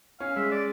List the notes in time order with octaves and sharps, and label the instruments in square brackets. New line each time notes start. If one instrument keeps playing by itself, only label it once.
[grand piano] C#4 [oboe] F5
[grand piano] G#3 [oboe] E5
[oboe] D5